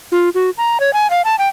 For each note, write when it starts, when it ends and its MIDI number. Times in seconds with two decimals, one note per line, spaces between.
0.12 0.29 65
0.35 0.50 66
0.58 0.80 82
0.80 0.93 73
0.93 1.10 80
1.10 1.22 77
1.25 1.35 81
1.39 1.48 79